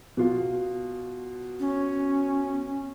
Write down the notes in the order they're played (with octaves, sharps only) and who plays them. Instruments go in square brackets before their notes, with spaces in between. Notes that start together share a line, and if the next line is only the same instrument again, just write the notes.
[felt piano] B2 F4
[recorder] C#4